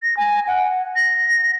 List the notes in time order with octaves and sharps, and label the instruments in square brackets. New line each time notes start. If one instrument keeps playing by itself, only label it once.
[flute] A#6
G#5
F#5
A#6